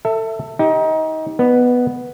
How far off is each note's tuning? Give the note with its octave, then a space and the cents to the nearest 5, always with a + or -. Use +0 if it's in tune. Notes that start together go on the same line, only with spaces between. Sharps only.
A4 +25 E5 +0
D#4 +25 G4 +0
B3 +0 D#5 -45